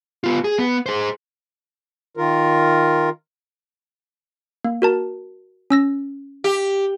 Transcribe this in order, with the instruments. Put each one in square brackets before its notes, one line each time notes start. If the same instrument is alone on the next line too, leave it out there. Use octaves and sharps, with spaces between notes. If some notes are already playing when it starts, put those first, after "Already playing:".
[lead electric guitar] B3 F4
G#4
B3
G#4 C5
[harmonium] D#3 F4 A#4
[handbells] A#3
F#4 A#4 A5
C#4 E6 A#6
[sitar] G4